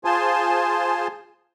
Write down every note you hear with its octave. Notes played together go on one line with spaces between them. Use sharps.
F4 G#4 C5 G#5 A5 C6